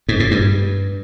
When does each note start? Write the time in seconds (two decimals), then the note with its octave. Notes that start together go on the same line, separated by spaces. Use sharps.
0.09 G#2
0.20 A2
0.31 G2